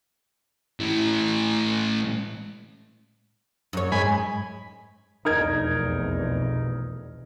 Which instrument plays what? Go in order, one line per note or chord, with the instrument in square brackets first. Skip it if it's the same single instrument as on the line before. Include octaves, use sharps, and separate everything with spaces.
[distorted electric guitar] A2 E3
[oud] F#2 C#5
[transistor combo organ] G#2 G#5 B5
[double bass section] F1 B1 E2 [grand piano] D#4 A#4 G#6